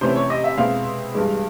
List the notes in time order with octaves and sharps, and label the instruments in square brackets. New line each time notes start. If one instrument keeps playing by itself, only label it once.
[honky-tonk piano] C3 E3 A3 C#4 E4 [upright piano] C5
[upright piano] C#5
D#5
E5
[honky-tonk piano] B2 G#3 C4 E4 [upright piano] F5
[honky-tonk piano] G2 E3 G#3